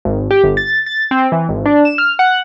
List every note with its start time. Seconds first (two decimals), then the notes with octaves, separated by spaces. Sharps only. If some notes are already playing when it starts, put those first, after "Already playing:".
0.05 G#1
0.31 G4
0.44 G1
0.57 A6
0.86 A6
1.11 C4
1.32 E3
1.49 G#1
1.65 D4
1.85 E7
1.98 F6
2.19 F#5